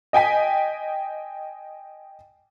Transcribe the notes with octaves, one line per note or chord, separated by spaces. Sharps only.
D#5 G5 G#5 B6